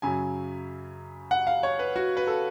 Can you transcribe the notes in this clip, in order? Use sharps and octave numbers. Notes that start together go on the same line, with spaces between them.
F#2 C#3 F#3 G#5
F#5
F5
C#5
B4
F#4
B4
A4